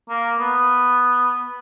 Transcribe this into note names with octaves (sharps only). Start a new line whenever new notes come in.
A#3
B3